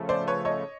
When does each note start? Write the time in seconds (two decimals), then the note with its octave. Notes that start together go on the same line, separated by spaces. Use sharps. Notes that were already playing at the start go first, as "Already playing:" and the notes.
Already playing: C#3 F3 A3
0.09 C5 D5
0.27 B4 C#5
0.45 C#5 D#5